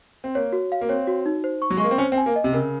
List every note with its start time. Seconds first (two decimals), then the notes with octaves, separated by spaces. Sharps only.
0.24 C4
0.35 A#3 C#5
0.53 F#4
0.72 F5
0.81 A#3
0.89 C4 C#5
1.07 F#4
1.26 D#4
1.44 C5
1.62 C#6
1.70 F#3
1.77 G#3
1.80 A#3 C#6
1.91 C4
1.98 C#4 C5
2.12 C4
2.18 G#5
2.26 A#3
2.36 D#5
2.44 C3
2.53 C#3 A#4